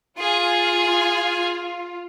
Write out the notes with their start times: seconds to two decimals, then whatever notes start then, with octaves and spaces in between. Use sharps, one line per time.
0.19 F4 G#4 G#5